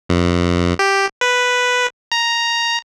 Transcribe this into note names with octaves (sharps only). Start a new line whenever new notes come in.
F2
G4
B4
A#5